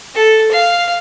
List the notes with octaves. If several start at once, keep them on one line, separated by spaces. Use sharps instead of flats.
A4
F5